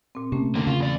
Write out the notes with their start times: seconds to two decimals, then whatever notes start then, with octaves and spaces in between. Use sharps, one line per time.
0.15 A#2 C4
0.32 C3 A3 A#3 C#4
0.55 D3 A#3
0.67 C#3 C#4 F4
0.80 E2 D5